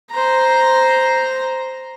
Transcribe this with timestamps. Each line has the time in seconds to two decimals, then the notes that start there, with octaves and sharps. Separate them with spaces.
0.11 C5 A#5